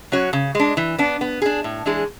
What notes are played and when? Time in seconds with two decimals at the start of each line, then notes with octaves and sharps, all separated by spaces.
0.12 F#3 C#4 F#4 C#5
0.33 C#3
0.55 G#3 D4
0.77 E3
0.98 B3 D4
1.21 B3
1.42 D4 G#4
1.64 A2
1.86 E3 G#3 D4 G#4